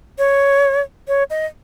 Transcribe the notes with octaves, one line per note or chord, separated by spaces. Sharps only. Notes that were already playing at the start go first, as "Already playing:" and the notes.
C#5
C#5
D#5